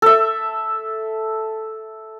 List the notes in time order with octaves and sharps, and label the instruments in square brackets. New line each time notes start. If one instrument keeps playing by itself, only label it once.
[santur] A4 E5